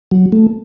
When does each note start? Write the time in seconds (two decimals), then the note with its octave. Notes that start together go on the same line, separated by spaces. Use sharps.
0.11 F#3
0.32 A3